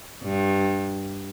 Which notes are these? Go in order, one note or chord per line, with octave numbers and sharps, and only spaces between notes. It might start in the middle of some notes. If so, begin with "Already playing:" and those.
G2